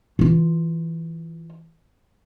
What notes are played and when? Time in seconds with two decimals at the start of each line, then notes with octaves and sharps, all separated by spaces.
0.19 E3 F4